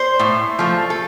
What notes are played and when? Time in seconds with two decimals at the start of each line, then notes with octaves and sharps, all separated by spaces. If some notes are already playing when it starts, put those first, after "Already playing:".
Already playing: C5
0.19 A2
0.59 F3 A3
0.90 A4